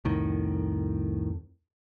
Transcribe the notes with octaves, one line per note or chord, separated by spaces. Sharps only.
C2 F2 A2 D#3